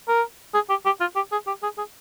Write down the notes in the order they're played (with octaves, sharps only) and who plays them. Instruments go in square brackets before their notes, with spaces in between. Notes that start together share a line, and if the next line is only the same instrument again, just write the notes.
[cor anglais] A#4
G#4
G4
G4
F4
G4
G#4
G4
G#4
G#4